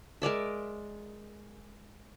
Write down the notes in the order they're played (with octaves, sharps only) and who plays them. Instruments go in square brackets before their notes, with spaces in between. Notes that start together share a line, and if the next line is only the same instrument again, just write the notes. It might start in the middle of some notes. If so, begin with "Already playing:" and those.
[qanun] G#3 A#4 D5 E5